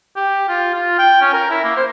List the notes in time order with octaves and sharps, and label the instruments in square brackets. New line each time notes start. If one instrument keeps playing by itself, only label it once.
[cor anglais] G4
F4
F4
G5
C#4
A#4
E4
A#3
C5